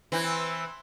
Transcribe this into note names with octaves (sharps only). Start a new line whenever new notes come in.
E3 C4 E4